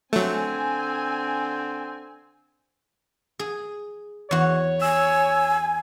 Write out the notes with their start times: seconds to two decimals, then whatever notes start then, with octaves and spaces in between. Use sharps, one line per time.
0.13 D3 F#3 A3 C4 G#5
3.39 G#4
4.31 E2 F#4 C#5
4.81 G#5 E6